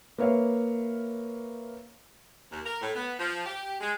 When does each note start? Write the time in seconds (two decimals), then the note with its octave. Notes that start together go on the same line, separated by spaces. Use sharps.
0.18 A#3 B4 C#5 E5 F5
2.52 D#2
2.65 A#4
2.82 A2
2.95 B3
3.19 F3
3.46 G4
3.81 G#3